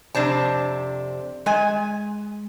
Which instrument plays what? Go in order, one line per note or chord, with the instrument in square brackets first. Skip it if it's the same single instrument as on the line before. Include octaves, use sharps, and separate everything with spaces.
[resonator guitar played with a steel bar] F2 C3 D4 C5 A5
G#3 G#5